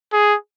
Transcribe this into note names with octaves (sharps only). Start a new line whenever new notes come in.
G#4